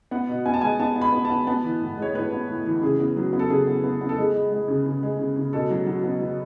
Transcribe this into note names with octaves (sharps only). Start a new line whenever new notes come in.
B3 F#5
B2
B3 G#5
A5
G#3 G#5
B3 A5
B3
B5
B3
A5
B3
B3 A5
E3
A2
G#3 C#5
A2 B4
B3
A2
E3
C#3 G#4
B3
F#3
B3
A4
C#3 G#4
B3
B3
B3
A4
G#3 G#4
G#3
G#3
C#3
C#3
G#3
C#3
C#3
B2 A4
F#3
F#3
B3
F#3